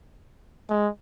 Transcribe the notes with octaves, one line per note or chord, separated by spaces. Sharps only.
G#3